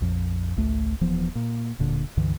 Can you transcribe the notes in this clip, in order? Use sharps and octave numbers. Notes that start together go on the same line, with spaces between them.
A#1 F2 F3
G#1 C#2 A3
D#1 E3 F3 B3
A#2
D1 A#2 D3
C#2 G2 D3 E3